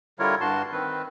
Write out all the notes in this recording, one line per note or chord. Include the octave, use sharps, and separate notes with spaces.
D3 G3 E4 F4 A#4 C#5
G2 F#4 A5 C6
D#3 C4 B4